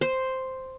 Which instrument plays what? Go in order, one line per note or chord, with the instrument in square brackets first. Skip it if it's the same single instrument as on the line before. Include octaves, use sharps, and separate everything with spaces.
[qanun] C5